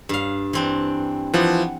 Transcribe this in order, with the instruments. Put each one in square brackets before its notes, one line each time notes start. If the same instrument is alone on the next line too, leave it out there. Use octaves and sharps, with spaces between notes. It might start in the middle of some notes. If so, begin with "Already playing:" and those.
[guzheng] G2 F5
E3 C4 D4
[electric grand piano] E3 F3 [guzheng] F#5